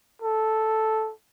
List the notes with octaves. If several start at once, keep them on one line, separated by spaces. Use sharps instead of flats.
A4